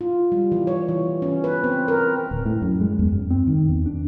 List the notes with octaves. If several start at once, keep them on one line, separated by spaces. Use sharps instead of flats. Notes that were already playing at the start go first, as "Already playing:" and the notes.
F4
G3
E3
C#5
E3
C#4
B4
C4
A#4
D1
A2
F#2
G#3
E2
F#2
C4
D#3
E2
D4